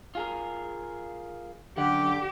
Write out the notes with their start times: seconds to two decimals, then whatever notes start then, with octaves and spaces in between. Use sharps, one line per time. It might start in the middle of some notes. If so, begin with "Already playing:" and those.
0.15 F4 G#4 A#4
1.78 F#2 D3 G4 F#5